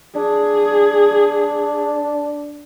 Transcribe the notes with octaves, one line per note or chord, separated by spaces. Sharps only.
D4 G#4